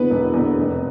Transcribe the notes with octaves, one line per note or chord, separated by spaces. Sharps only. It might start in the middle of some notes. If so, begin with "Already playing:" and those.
Already playing: E2 D3 B3 B4
E1
E2 D3
F1